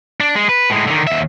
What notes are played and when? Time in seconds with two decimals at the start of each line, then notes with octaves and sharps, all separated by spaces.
0.20 D4
0.35 G#3
0.49 B4
0.70 A2 G#3
0.87 D3 D#3
1.07 D#2 E5